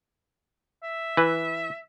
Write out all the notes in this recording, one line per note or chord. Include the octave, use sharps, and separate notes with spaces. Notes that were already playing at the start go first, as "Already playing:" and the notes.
E5
E3 B4